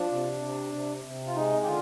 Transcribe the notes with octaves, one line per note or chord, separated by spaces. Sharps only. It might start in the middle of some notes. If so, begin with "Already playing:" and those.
Already playing: F3 D4
C3
C3
C3
C3
F4
G#3 D#4
G4
D3 F4